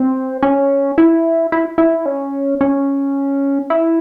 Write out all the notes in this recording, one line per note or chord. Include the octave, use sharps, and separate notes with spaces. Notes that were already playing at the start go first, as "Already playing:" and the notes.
Already playing: C4
C#4
E4
E4
E4
C#4
C#4
E4